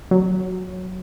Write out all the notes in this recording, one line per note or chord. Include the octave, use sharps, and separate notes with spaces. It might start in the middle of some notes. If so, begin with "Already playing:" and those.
F#3